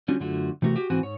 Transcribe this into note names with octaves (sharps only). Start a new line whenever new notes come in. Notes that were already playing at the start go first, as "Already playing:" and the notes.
D3 G3 C#4 F4 F#4
F#2 D3 A3 F4 F#4
C3 E3 A3 F#4 A#4
F#4 G4
G#2 E3 C4 F#4 F#5 G#5
G#2 C#5